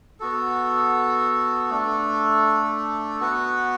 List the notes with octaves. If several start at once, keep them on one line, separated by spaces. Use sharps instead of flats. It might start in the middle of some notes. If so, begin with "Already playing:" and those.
B3 F#4 A4
A3 D4 A4
B3 F#4 B4 F#5